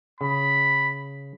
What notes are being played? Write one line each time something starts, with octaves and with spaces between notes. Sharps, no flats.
C#3 B5